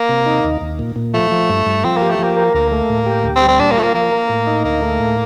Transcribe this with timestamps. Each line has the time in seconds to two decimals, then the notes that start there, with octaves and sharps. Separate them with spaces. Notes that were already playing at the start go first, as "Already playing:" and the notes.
Already playing: A#3
0.09 C3
0.26 D#4
0.44 D#2
0.61 D#2
0.79 A#2
0.96 A#2
1.14 F3 A3
1.31 F3
1.50 G2
1.66 G2
1.84 F3 C4
1.97 A#3 G4
2.10 A3
2.19 F3 A#3
2.37 A#4
2.54 D2 A#3
2.72 A3
2.90 A2
3.06 G4
3.24 D2
3.36 C4
3.42 G3
3.48 C4
3.59 A#2 D4
3.71 A#3
3.77 A3 F4
3.83 A#3
3.94 F3 A#3
4.12 A#4
4.29 A2
4.47 D#4
4.64 D2 A#3
4.82 A3
5.00 A2